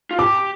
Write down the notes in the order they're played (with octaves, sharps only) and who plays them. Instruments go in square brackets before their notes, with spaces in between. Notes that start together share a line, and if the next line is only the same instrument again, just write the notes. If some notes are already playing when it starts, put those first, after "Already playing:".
[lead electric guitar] F4
[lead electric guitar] G4 [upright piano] D6